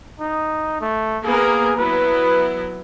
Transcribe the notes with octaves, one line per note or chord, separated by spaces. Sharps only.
D#4
A3
A#3 B3 G#4 A#4
F#3 B3 E4 B4